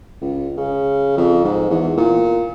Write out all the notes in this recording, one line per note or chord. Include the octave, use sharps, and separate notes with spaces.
C#2
C#3
F2
G#2
E2
A#2